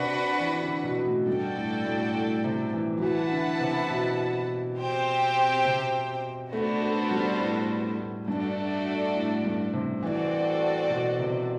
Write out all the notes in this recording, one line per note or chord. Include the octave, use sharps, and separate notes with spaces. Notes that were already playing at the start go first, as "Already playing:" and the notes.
Already playing: C3 D4 F#4 B4 F#5
E3
D3
B2
B2
A2
G2 F#4 A4 D5 G5
A2
A2
A2
C3
E3
F#3
E3 E4 B4 F#5 A5
D3
C3
B2
C4 G4 C5 G5
C3
A3 B3 D4 F#4 A4 C5
A3
G3
A2
A2
G2 A3 D4 F#4 A4 D5
A2
G2
C3
E3 C4 F#4 A4 D5
B2
C3